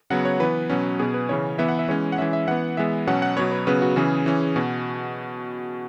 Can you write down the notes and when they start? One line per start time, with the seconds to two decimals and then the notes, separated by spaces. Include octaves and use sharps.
0.10 C#3 F#3 B3 F#5
0.25 C#5
0.40 E3 B3 B4
0.70 B2 F#3 C#4
0.99 B2 B3 G#4
1.14 B4
1.29 C#3 E3 C#4 C#5
1.58 E3 B3 E5
1.68 F#5
1.79 E5
1.88 E3 G#3 C#4 C#5
2.12 F#5
2.18 E3 G#3 C#4 E5
2.33 E5
2.48 E3 B3 F#5
2.77 E3 G#3 B3 E5
3.07 B2 F#3 C#4 F#5
3.22 F#5
3.37 B2 F#3 B3 C#5
3.52 B4
3.67 C#3 F#3 B3 B4
3.82 F#4
3.96 C#3 E3 C#4 G#4
4.26 E3 C#4
4.56 B2 F#4